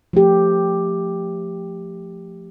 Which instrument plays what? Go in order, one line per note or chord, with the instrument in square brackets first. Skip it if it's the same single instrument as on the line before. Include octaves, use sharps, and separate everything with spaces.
[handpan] F3 A3 G4